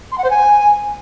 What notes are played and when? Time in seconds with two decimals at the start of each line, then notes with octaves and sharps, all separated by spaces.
0.12 C6
0.18 F#5
0.24 C5
0.30 G#5